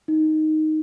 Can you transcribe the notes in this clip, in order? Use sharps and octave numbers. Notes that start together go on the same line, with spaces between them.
D#4